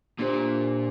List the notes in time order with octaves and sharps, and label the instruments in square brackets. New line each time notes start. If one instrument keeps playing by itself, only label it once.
[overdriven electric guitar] A#2 [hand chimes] A#3 D4 G4 C5